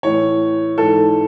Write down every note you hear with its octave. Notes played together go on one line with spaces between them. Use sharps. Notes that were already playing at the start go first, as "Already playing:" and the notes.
A2 E3 C#5
G#2 E3 A4